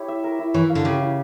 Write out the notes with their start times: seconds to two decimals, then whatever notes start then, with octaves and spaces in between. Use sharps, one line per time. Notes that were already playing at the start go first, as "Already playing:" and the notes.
Already playing: E4 G4 C#5
0.08 E5
0.24 A#4
0.39 E4
0.54 E3 C#5
0.69 F5
0.75 D3
0.85 C#3 G4
1.00 E4